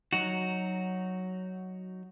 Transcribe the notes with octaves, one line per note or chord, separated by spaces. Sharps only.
F#3 D#4 F#4